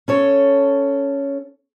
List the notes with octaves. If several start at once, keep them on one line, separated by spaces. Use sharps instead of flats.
C#4 A4 C#5